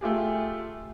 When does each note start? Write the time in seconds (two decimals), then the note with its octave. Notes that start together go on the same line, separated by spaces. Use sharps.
0.01 A3 F4 G4 G#4